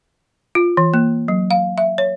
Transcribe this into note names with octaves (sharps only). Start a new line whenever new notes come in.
F4
E3
A#3
F#3
F5
E5
C#5